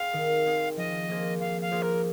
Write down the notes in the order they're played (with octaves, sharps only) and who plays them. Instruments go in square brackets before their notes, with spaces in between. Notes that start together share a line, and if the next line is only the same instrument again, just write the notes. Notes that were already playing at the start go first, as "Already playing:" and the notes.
Already playing: [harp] C4 G#4 [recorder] F5
[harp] D#3
C4 G#4
[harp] F3 [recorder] D#5
[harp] A#3 F4 G#4 C5
[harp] F3 [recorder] F5
[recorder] F5
[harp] A#3 F4 G#4 C5
[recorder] A#4